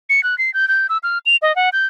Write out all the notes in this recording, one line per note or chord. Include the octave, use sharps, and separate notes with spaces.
C#7
F#6
C7
G6
G6
E6
F6
F7
D#5
F#5
G6